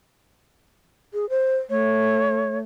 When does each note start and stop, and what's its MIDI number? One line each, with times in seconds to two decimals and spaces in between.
1.14 1.28 68
1.30 1.57 72
1.70 2.63 57
1.70 2.58 73